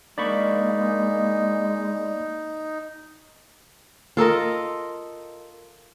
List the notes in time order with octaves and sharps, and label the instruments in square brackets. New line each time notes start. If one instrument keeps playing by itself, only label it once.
[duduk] G#3 [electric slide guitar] A#3 D4 [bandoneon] D#4 [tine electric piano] D5 B5 C#6
[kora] F4 A4 A#4 D#5